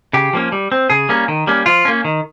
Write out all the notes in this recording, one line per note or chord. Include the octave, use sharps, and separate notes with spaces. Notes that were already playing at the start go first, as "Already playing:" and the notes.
C#3 G4
F3 A#3 C#4
G3
C4
C#3 G#4
G3 A#3 C#4
D#3
G3 A#3 C#4
F3 F4
A#3 C#4
D#3